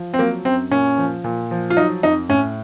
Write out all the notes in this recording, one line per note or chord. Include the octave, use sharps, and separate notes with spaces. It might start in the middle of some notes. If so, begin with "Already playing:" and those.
Already playing: F3
C4
F#3 A#3
F#2 C4
A#2 C#4
F3
A#2
F3
F4
F#3 D#4
F2 D#4
A2 C#4